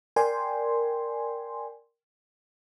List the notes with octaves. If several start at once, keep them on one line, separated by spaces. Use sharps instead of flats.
A#4 D5 G5 G#5 C6